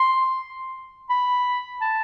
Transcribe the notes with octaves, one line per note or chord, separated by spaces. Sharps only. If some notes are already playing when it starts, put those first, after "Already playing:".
Already playing: C6
B5
A5